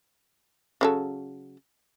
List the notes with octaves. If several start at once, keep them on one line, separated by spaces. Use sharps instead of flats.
C#3 F#3 A4